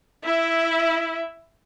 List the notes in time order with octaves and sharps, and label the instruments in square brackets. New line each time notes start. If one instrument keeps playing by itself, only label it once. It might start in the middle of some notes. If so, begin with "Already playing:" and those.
[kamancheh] E4 E5